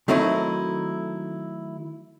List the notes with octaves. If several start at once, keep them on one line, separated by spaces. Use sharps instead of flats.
D#3 F#3 A3 C4 D#4 E4